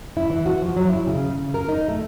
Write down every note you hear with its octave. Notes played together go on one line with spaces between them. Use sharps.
E4
E3
F#4
F3
F#3
E4
C#3
C#3
A#4
D#4
A3